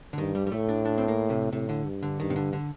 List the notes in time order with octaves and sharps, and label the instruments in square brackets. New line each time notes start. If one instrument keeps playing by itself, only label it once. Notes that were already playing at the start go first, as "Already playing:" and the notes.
[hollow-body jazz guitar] D3
[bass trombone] G2 [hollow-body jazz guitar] D#3
[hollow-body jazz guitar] G3
G3
[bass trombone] A2 [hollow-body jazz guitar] A3
[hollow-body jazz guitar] D4
D4
C4
A#3
C3
[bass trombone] A2 [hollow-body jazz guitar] C3
[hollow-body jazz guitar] D3
[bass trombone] G2
[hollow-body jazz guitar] D3
[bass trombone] G2 [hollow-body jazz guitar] D#3
[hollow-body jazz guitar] C3
D3
D3